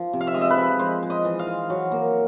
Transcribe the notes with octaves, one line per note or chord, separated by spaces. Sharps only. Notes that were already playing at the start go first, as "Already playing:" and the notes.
Already playing: F3
C3
F5
E5
G#3 D#5
E5
B4
F3
G#3 C5
G#3
D#5
E3
F5
E3
F#3
A#3